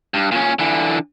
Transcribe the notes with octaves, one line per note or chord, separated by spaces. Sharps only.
G2
A#2 C#4
D3 E3